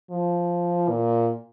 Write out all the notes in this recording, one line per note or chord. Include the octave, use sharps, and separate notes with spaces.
F3
A#2